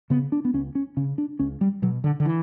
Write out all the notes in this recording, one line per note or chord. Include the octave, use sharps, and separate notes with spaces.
C#3 B3
D4
B3
C#2 C#4
C#4
C#3 C#4
D4
C#2 C#4
G3
B2 F#3
D3
D3
E3